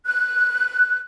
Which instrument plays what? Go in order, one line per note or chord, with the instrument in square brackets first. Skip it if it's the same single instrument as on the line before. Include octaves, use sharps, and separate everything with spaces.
[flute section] F#6